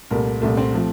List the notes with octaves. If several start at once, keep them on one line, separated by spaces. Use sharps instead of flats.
C2 A#2 A3 A#4
C2 A#2 A3
C4
F3 A3